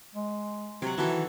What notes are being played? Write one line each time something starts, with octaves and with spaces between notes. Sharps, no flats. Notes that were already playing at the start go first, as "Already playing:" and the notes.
G#3
C3 F#3 F#5
D#3 E3 F#4 A4